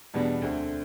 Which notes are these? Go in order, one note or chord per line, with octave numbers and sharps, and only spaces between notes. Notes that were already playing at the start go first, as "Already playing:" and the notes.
E2 B2 G3 B3 D4
D2 D3 A3 C4